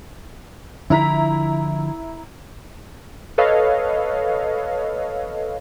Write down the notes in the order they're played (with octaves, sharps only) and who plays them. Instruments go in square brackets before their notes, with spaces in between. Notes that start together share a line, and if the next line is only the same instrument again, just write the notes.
[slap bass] D3 F3 [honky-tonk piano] E4 A#5 B6
[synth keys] A4 B4 C#5 D#5 F5